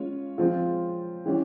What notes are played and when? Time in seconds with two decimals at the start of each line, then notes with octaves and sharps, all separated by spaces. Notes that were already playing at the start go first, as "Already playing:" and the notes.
Already playing: G#3 C#4 F4 C#5
0.38 F3 G#3 C4 F4
1.26 E3 G3 C#4 G4